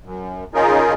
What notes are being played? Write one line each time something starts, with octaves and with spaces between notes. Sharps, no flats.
F#2
C#3 C#4 D#4 F4 G#4 A#4